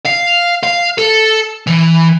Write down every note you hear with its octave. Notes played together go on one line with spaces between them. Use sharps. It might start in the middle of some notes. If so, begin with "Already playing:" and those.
F5
F5
A4
E3